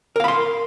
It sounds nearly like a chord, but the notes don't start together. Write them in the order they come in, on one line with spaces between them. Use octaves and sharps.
A#4 F5 B5 C6